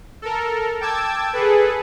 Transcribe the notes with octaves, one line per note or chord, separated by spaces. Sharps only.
A4 A#4
G5 A5 D6 E6 G#6
G#4 A4 B4